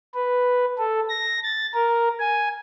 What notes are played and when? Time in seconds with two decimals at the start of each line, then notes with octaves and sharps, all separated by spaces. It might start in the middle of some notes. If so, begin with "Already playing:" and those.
0.15 B4
0.78 A4
1.09 A#6
1.43 A6
1.74 A#4
2.19 G#5